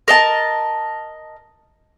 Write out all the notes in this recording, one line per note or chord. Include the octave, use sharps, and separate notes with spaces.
A#4 D#5 A5